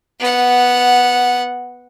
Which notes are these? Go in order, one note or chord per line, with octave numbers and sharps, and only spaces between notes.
B3 F#5